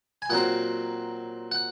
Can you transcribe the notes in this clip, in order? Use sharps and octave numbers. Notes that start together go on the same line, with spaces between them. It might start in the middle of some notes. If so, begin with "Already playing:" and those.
G#5
A#2 F#3 C4 F#5
F#5